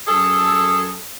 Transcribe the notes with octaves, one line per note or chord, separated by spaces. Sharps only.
F#2 G#4 A4